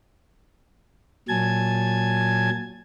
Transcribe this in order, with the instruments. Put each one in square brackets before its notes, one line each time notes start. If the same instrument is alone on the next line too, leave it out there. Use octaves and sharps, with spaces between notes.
[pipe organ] A#2 F#3 G#5 A5 G#6